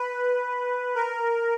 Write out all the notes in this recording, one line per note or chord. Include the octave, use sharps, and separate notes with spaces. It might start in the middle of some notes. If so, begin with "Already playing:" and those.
Already playing: B4
A#4